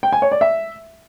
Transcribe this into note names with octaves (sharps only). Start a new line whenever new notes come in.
G5
G#5
C#5
D5
E5